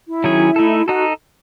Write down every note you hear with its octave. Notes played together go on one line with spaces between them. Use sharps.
E4
D#3 F#3 C#4 G#4 C#5
A3 D#4 A4
D#4 F#4 A4